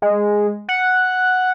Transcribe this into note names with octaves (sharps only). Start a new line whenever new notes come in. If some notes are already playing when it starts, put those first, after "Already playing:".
G#3
F#5